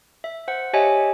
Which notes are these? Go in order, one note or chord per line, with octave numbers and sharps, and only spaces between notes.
E5
C5 F#5
G4 C#5 D#5 E5 G#5 A5